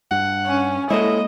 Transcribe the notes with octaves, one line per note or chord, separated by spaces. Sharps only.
G2 F#5
C#4
G#3 A#3 E4 A4 C5 C#5 D#5